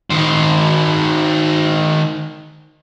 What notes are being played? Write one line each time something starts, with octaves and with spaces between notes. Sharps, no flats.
D#3 C5